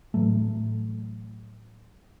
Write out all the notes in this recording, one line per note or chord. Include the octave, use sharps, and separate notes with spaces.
A2 E3 F#3 A3